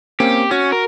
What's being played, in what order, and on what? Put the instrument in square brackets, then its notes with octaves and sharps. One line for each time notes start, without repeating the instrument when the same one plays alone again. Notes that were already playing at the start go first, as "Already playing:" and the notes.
[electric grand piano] A#3 C4 C#4 [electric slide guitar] G4
[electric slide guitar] C#4 [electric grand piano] F#4
[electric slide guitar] A#4